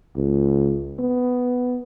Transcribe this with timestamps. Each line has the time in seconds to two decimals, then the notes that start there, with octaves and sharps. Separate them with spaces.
0.17 C#2
0.99 B3